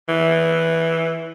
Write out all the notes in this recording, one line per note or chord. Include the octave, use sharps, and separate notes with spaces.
E3